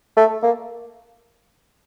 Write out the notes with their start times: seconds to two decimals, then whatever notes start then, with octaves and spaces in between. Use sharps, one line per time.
0.17 A3
0.43 A#3